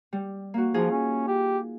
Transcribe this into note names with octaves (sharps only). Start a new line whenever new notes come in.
G3
A#3 F#4
F3 D#4 F4 G#4
C#4
G4